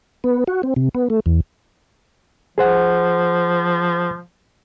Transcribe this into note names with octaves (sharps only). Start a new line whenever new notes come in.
B3
F#4
C4
C3
B3
A3
E2
F3 G#4 C5 F#5